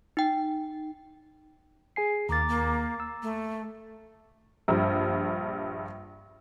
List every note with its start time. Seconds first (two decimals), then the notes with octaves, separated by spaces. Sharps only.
0.17 D#4 G5
1.96 G#4 G#5 C7
2.29 D#2 A#3 A#5 D6 A6
2.48 A#3
3.00 E6
3.23 A3
4.68 A#1 G2